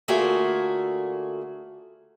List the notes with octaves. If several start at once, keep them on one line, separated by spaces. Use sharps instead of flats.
D3 A3 A#3 F4 F#4 G#4